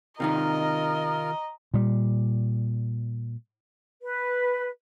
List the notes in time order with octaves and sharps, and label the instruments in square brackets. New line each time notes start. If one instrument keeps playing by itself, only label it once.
[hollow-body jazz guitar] C3 D#3 D#4 [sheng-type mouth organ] F4 A#4 [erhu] D#5 [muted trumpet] A#5
[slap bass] A#2 G3
[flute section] B4